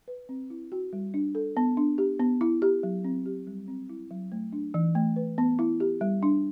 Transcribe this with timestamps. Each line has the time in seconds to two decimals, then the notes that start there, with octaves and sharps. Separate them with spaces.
0.08 B4
0.29 C4
0.50 E4
0.72 F#4
0.93 G3
1.14 D4
1.35 A4
1.57 B3
1.77 D4
1.98 G4
2.20 B3
2.41 E4
2.62 G4
2.83 F#3
3.04 C4
3.26 G4
3.47 G3
3.68 C4
3.89 E4
4.11 F#3
4.32 A3
4.53 D4
4.74 E3
4.95 A3
5.16 B4
5.38 B3
5.59 E4
5.80 G4
6.01 G3
6.23 D4